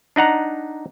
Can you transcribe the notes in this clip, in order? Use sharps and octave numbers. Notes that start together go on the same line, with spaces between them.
D4 D#4 F#5 A#5